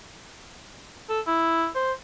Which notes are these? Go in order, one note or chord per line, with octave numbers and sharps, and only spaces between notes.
A4
E4
C5